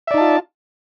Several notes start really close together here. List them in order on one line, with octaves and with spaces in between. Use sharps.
E5 D5 D#4 A5 F4